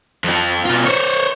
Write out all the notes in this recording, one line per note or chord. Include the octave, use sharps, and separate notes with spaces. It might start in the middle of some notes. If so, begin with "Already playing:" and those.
F2 F3
B2 F4
C5 C#5